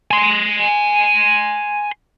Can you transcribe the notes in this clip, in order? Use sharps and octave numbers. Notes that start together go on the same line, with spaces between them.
G#5 C6